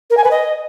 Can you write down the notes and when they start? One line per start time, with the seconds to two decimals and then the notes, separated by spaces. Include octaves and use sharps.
0.10 A#4
0.17 G#5
0.24 B4
0.31 D#5